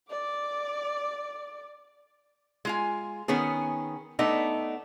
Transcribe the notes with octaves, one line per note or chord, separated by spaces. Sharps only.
D5 D6
G#3 F4 G#5
D#3 B3 C#4 G#4
A3 B3 D4 D#4